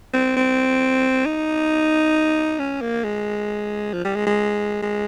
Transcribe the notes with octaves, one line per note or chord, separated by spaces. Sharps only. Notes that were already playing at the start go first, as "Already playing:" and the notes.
C4
C4
D#4
C#4
A#3
G#3
F3
G3
G#3
G#3
G#3